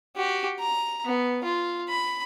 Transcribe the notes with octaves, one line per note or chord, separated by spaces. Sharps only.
F#4 G4
A#5
B3
F4
B5